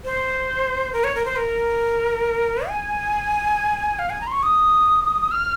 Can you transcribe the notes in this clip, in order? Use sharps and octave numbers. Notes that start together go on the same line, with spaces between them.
C5
A#4
C#5
A#4
C5
A#4
G#5
F5
G#5
A#5
C6
C#6
D#6
F6